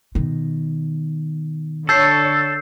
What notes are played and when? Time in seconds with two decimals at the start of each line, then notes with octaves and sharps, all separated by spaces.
0.15 B2 D#3
1.89 D3 A4 C#5 E6 G6 C7